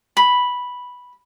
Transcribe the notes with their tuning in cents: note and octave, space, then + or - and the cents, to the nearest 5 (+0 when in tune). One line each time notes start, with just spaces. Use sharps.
B5 -5